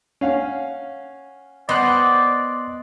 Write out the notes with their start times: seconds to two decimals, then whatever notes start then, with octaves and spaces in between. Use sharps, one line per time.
0.21 C#4 F5 F#5
1.69 B3 C5 D5 D#5 G5 C6 F#6